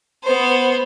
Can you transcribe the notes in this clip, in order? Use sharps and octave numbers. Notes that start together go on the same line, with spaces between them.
B3 C5